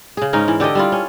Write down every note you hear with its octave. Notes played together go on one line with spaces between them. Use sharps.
C#3 G#4
G#2 C#4 D#4 A#4
E3
D3 G4 A4 D#5
G3 E4 F4
C#4